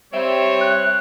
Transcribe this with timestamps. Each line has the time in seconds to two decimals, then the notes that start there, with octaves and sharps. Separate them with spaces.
0.14 G3 C4 C#5 E5
0.61 F#6